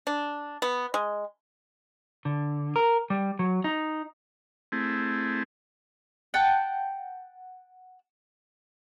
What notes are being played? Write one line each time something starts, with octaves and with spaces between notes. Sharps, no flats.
D4
B3
G#3
D3
A#4
G3
F#3
D#4
A3 C4 E4 G#4
F#5 G5 A5